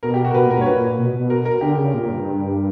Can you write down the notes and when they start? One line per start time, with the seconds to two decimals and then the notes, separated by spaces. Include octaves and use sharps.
0.03 B2 A#4
0.14 G4
0.25 F#4
0.30 A#4
0.35 B2 B4
0.46 A#2 A#4
0.58 G2 C#5
0.66 A#2 B4
0.98 B2
1.13 B2
1.30 A#4
1.45 A#4
1.61 D3 G4
1.77 C#3
1.94 A#2
2.09 G2